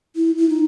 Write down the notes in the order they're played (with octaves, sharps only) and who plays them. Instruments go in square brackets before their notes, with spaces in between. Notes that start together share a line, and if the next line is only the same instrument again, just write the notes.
[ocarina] E4
E4
D#4